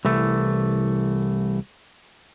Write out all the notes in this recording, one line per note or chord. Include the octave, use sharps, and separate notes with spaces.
C2 E3 A3